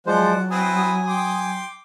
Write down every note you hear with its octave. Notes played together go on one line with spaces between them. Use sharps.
F3 F#3 G#3 C5 D5 F#5
C4 E4 B4 G#5 D#6
G5 C6 D6